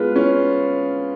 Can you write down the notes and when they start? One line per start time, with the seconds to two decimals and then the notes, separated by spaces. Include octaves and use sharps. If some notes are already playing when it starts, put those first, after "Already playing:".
Already playing: G#3 B3 F4
0.16 C#4